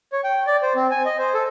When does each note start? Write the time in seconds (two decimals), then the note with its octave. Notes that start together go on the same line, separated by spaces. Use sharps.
0.12 C#5
0.24 G5
0.47 D5
0.62 C5
0.75 C4
0.91 G#5
1.05 D#5
1.18 C5
1.34 A4